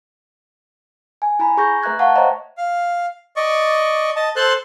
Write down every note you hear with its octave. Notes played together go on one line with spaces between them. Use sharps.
G#5
E4 G#5 A#5 B5
G#4 C#6 G6 A#6
A3 B4 E5 A#5 F#6 G#6
F5 F#5 A5 C#6
C5 C#5 D#5 E5 G5 A#5
F5
D5 D#5 C#6
D#5 A5
A4 C5 A5 C6 F#6